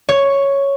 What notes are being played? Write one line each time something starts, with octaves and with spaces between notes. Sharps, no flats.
C#5